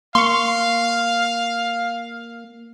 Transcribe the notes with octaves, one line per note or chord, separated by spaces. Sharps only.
A#3 F5 C6 C#6